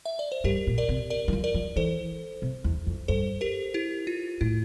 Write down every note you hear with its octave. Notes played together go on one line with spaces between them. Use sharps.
E5
D5
C5
G2 G4 A#4
A#2
A#4 D5
C3
A#4 D5
E3
F3
A#4 D5
F3
E3 A4 C5
C3
E2
F2
G2 A4 C5
G4 A#4
E4 G4
F4
A2 E4